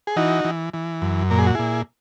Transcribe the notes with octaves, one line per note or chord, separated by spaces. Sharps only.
G#4
E3 D#4 F#4
E3
E3
F#2
A#2 A#4
G#4
F#4
A#2 E4 G#4